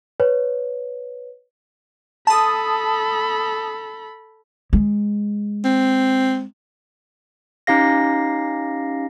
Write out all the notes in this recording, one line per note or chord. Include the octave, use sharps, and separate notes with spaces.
B4 C#5
A4 A5 B5 D#6
G#3
C4
C#4 D#4 G4 F5 A#6